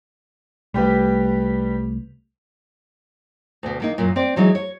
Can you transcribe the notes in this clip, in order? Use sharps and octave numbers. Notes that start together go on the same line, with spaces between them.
C2 G3 A3 G4 B4
D2 B2
D#3 A#3 D#4
F#2 A#2
C4 D5
E3 F#3 G#3 D#4
C#5